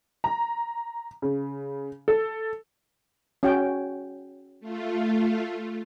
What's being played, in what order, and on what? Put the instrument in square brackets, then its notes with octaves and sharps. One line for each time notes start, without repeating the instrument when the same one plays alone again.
[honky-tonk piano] A#5
C#3
A4
[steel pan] C#4 F#4 G5
[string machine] A3 F4